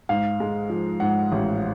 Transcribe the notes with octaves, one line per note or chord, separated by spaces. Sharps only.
G#2 F5
G#3
F3
G#2 F#5
A1